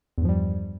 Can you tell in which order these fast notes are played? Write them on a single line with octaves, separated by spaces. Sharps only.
E2 G2 F3 G3